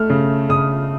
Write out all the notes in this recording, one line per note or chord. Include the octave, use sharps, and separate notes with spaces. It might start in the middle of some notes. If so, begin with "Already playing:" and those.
Already playing: A3 F6
C#3
C#3 D#6